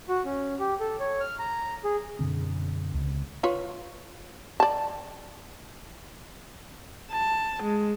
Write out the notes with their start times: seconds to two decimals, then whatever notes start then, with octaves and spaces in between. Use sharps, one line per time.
0.09 F#4
0.25 C#4
0.59 G4
0.80 A4
1.00 C#5
1.21 F6
1.39 A#5
1.84 G#4
2.19 F#2 B2 D3 C4
2.94 C#2
3.43 F4 B4 C#5
4.60 D5 A5
7.11 A5
7.63 G#3